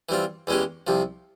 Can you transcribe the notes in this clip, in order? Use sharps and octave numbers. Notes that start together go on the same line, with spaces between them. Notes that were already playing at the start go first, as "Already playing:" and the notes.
E3 G3 C4 F4
E2 E3 G#3 C#4 G4
C2 C3 F3